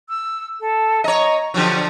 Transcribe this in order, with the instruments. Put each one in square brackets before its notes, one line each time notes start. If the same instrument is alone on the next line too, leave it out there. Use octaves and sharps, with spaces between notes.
[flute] E6
A4
[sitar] C#5 D#5 [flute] A#5
[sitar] D3 F3 F#3 [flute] G4